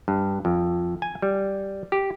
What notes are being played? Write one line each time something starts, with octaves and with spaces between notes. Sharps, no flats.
G2
F2
G#5
G3
G4